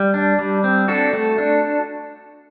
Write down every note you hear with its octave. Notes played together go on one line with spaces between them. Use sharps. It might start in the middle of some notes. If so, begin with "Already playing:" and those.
Already playing: G3
D4
G3
C4
D4 F#4 A4
A3
D4